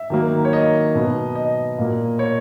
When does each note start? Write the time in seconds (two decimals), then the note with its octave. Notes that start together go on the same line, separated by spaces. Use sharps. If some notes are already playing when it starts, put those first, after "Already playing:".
Already playing: E5
0.10 D#3 F#3 A#3
0.45 C#5
0.53 D#5
0.95 B2 F#3 B3
1.35 D#5
1.78 A#2 A#3
2.19 C#5